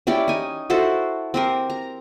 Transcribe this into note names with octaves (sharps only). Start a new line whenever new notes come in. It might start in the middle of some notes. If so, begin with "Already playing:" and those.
C#4 E4 G4 D5
D#4 G#5
E4 F#4 A4 C5
C4 G4 A#4
A#5